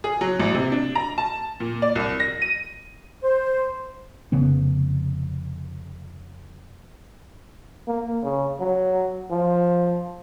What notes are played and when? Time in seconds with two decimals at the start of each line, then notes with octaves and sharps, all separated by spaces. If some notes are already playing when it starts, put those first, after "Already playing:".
0.04 G#4
0.21 F#3
0.40 A1
0.54 C3
0.72 D4
0.95 A#5
1.18 A5
1.60 A#2
1.82 D5
1.96 C2
2.20 A#6
2.42 D#7
3.24 C5
4.32 F1 C#3 B3 C#4
7.88 A#3
8.24 C#3
8.60 F#3
9.31 F3